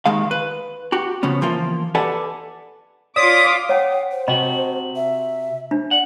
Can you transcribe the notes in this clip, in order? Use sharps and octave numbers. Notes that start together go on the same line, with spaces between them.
D#2 D#3 G#3 F5
B4
F#4 G4
C#3 F3 B3 C#4
E3 F3 A#3 F4
G4 A4 B4 D5 F#5 G#5
F4 C#5 D5 D6 D#6 B6
C#5 F#5 G5
C5
C3 F#4 D#5 G5 B5
E5
D4
D5 F#5